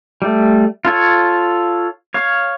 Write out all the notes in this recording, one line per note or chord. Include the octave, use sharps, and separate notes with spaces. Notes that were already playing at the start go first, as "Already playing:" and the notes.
G3 A3
F4 A4 C#5
C#5 F5